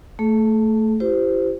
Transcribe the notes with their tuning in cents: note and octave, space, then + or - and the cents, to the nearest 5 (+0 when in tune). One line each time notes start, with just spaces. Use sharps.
A3 +10 A4 -40
E4 +40 G4 -10 C5 -25